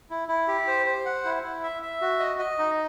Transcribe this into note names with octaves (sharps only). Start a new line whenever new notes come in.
E4
E4
G4
C5
C5
F#5
E4
E4
E5
E5
F#4
D#5
D#5
D#4